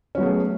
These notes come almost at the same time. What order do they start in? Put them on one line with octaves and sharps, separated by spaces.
C#4 F#3 B3 G#4 A3